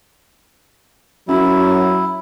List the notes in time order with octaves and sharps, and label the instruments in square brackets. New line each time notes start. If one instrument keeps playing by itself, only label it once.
[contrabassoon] F#2 [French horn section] F#3 [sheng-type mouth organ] E4